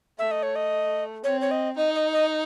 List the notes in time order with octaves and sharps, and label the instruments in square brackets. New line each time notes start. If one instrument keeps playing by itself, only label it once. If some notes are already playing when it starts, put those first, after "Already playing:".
[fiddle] A3 [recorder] E5
[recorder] D#5
C#5
D#5
[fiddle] C4 [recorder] C#5
[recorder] C#5
D#5
[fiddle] D#4 [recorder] D#5
[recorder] D#5
D#5